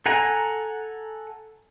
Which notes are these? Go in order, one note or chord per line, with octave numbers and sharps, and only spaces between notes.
A4 F#5 G#5 A#5